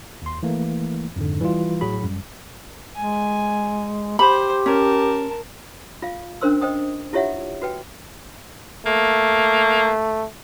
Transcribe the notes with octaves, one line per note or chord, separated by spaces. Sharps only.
D#2 C6
E3 A3 A#3
F2 G#2 D3
E3 G3 E4 F4
A2 F#3 F#4 G#4 B5
F#2 G3
G#3 G#5
G4 C5 B5
C#4 A#4 A5
F4 F5
C#4 D4 A#4 C5 C6 E6
C5 D#5 G5 D#6
E4 F4 G4 C#5 E5 F#5
F#4 B4 G5
A3 A#3